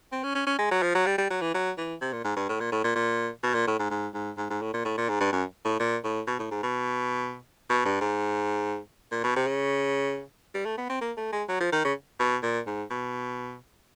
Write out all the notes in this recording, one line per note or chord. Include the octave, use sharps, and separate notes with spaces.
C4
C#4
C#4
C#4
G#3
F#3
F3
F#3
G3
G3
F#3
E3
F#3
E3
C3
A#2
G#2
G2
A2
A#2
A2
A#2
A#2
B2
A#2
A2
G#2
G#2
G#2
G#2
G#2
A2
A#2
A2
A#2
G#2
G2
F#2
A2
A#2
A2
B2
A2
G#2
B2
B2
G2
G#2
A#2
B2
C3
C#3
G3
A3
B3
C4
A#3
A3
G#3
F#3
F3
D#3
C#3
B2
A#2
G#2
B2